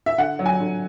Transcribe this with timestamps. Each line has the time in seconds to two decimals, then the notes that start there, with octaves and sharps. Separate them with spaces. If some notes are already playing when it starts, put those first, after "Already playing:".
0.06 E5
0.18 D3 F#5
0.39 F#3
0.46 G#5
0.60 D3